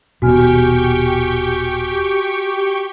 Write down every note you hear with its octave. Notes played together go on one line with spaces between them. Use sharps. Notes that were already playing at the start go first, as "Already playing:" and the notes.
D#1 B2 F#4 G4 G5 G#5 C#6 F6